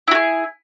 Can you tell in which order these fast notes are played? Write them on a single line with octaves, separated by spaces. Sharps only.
E4 F#4 G#4